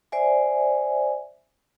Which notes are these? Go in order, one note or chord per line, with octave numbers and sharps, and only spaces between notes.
C5 D5 E5 G#5